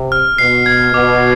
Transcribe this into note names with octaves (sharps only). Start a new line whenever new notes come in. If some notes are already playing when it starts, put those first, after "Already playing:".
Already playing: C3
F6
B2 C7
G#6
B2 D6